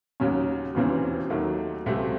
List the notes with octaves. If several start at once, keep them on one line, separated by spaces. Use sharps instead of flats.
D#2 C#3 F#3 C#4
E1 D#2 C#3 E3 C4
D#2 D#3 F#3 A3
C#2 C3 F#3 A3 C4